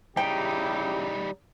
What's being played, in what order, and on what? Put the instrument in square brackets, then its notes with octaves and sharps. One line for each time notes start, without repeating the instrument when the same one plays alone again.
[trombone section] C#3 E4 G4 [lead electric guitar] G3 D#4 [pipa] G5